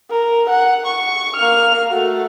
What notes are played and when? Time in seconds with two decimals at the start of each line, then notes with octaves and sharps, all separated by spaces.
0.10 A#4
0.50 F#5
0.86 C#6
1.36 A#3 F6
1.90 A3 F#4